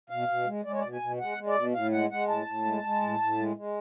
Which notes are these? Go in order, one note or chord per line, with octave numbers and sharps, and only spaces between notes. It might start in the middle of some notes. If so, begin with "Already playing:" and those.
B2 F5
B2
G#3
G#3 D5
C#5
D5
B2
G#5
B2
G#3 F#5
G#3
D5
B2
A2 F5
G#3 F#5
G#3 F#5
A2 A5
A2
G#3
G#3
A2
A2
G#3
G#3